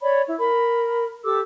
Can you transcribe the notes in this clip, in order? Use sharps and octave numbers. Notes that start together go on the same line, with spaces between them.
C#5 D5 B5
E4
A#4 B5
G4 A4 D6 E6